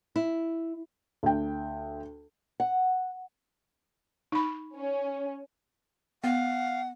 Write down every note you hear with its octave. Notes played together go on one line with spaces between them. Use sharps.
E4
D2 G5
F#5
D#4 B5
C#4
B3 F5 F#5